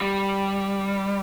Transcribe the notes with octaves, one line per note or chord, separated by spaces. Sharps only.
G3